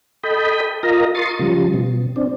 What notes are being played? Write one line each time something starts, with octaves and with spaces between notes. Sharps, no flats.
A4 D#5 G5 B5
F4 A#4 D#5 A#5
C6 C#6 D#6 A6
C#3 F3 G3
B2
C4 D4